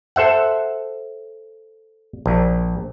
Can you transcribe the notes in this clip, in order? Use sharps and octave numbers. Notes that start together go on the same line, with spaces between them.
A4 C5 E5 F#5
A#1